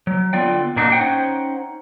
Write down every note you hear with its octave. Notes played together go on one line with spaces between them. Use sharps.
F#3
D3 B3 F4 D5 G5
A#2 A#3 D4 D#4 F4 F#4
C#4 D#4 C5 F#5 G5